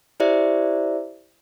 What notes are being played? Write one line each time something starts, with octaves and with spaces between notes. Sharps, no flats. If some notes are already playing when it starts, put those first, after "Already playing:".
E4 G4 C5 D5 E5